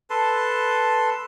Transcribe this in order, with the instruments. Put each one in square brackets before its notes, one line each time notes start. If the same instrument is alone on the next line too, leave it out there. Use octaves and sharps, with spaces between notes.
[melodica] A4 B4 A5 C6